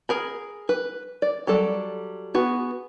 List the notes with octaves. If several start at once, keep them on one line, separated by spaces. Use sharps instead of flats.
G#4 A#4 B5
B4
D5
F#3 G3 A4 D5
B3 F#4 G#4